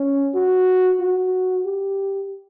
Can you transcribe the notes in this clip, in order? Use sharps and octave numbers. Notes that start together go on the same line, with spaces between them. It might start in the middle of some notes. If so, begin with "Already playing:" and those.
Already playing: C#4
F#4
F#4
G4